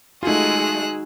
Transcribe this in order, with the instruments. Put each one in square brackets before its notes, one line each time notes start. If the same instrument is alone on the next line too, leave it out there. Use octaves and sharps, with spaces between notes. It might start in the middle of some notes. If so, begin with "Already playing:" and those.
[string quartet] G#3 E6 [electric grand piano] A3 F4 [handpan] D#4 F#4 [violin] G#4 F#6